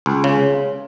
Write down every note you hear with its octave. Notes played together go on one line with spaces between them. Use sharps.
C#2
C#3